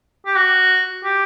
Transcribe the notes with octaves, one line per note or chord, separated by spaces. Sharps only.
G4
F#4
G4